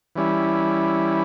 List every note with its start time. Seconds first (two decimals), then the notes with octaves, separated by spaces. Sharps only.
0.16 E3 G3 C#4 E4